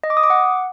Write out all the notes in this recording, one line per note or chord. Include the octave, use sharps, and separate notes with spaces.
D#5
D6
D#6
D6
F#5